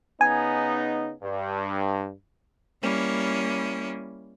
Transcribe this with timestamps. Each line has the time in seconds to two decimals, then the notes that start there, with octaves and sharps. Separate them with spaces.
0.21 C#3 B3 D#4 G#5
1.22 G2
2.83 G3 A#3 C#4 E4